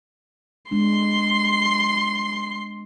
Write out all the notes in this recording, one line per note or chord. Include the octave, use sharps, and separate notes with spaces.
G#3 B3 D4 C6